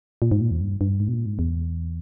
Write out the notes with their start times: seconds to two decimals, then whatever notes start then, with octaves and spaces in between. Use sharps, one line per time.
0.22 A#2
0.31 G#2
0.41 A#2
0.51 E2
0.61 G2
0.81 G2
1.00 G#2
1.08 B2
1.13 A#2
1.26 G#2
1.39 E2